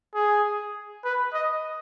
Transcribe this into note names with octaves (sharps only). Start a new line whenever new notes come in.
G#4
B4
D#5